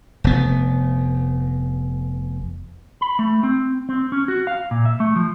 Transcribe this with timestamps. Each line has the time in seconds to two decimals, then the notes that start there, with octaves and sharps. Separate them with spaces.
0.24 F1 B3
3.01 B5
3.19 A3
3.43 C4
3.89 C4
4.12 C#4
4.28 F#4
4.47 F5
4.71 A#2
4.85 E5
5.00 A3
5.16 F3